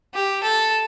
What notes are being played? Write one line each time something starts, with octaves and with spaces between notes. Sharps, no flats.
G4
A4